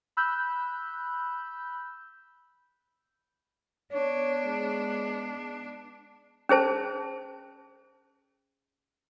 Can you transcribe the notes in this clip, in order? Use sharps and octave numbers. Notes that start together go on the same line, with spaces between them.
B5 E6 F#6 G6
B3 D4 C#5
G#3
C#4 G#4 C5 A5